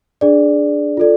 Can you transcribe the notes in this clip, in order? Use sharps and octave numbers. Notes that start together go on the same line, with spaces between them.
D4 G#4 D5
F4 A4 D5